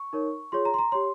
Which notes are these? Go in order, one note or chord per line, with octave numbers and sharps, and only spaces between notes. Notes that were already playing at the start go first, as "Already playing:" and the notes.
Already playing: C#6
D#4 A#4 C#5
F4 G#4 C#5 C6
A#5
C6
A#5
G4 C#5 C6